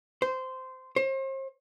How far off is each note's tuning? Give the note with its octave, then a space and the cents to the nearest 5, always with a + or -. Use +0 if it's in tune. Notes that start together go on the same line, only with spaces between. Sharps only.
C5 -15
C5 +40